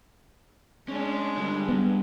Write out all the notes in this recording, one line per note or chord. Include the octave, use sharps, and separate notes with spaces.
G#3 C#4 D4
G2 D3
G2 B3